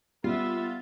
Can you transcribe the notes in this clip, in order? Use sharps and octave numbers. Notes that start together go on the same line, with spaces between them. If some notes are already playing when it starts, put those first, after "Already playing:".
G3 B3 F4 E5